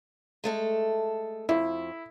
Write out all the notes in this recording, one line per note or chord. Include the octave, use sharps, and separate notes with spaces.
G#3 A3 A4
F2 E4